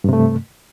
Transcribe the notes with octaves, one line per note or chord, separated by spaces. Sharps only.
G2 C3 A3